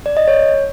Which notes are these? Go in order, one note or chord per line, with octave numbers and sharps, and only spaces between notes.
D5
D#5
C#5